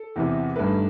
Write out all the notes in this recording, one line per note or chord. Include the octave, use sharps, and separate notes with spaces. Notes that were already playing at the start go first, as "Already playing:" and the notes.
Already playing: A4
E2 C3 E3
G2 D#3 A3 B4